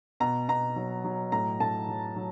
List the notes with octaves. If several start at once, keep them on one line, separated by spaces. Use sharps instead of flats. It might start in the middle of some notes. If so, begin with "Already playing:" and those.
B2 A#5
B2 A#5
F#3
F#3
A2 A#5
A2 A5
F#3
F#3